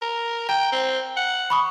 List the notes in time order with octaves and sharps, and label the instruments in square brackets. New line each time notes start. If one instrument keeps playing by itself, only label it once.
[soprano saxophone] A#4
[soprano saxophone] G5 [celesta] A#5
[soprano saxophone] C4
F#5
[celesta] B5 C#6 D#6